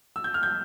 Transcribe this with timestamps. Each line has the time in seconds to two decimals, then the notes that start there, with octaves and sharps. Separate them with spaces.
0.16 E6
0.24 G6
0.34 F6
0.43 G6